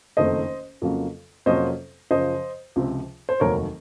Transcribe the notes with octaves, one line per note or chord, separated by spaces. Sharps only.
F#1 F2 D#3 A3 C4 C5 D#5
F2 C#3 F#3 A#3
F2 C3 F#3 A#3 C#4 C5 D#5
F#2 C#3 F3 C5 D#5
C#2 C3 F3 C4
C5
F1 D#2 D#3 F#3 A#4 C#5